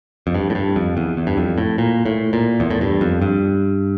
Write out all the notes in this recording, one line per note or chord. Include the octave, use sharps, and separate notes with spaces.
F2
G2
A2
G2
F2
E2
E2
G2
F2
A2
A#2
A2
A#2
E2
A2
G2
F2
G2